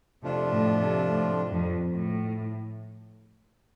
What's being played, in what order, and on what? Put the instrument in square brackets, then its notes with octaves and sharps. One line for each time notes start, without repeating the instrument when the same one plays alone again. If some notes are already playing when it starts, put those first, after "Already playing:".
[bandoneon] F2 F3 A3 D4 F4 [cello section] C3
[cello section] A2
C3
A2
F2
A2